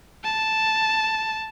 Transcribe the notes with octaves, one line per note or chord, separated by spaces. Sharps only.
A5